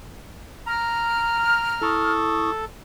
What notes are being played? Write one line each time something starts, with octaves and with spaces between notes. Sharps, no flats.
A#5 F6
E4 A4 C#6 D#6